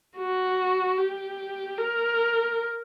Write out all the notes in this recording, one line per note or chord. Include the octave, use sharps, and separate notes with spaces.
F#4
G4
A#4